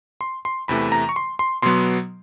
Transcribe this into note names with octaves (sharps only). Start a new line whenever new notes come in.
C6
C6
E2 C3 E3 A3 B5
A#5
C#6
C6
C6
B2 F#3 B3 C6